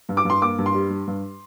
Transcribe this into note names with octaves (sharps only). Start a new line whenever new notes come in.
G2
D6
G2 C6
A#3 D6
G2
C6
G3
G3
G2